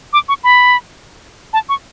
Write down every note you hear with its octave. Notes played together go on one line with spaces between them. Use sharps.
D6
C#6
B5
A5
C#6